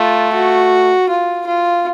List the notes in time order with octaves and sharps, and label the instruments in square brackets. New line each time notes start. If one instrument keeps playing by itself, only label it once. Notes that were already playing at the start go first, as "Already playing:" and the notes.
Already playing: [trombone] A3 [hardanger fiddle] F4
[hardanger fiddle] F#4
F4
F4